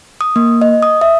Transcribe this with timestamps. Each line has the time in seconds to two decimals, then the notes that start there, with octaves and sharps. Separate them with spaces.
0.21 D#6
0.36 A#3
0.62 D#5
0.82 D#6
1.01 E5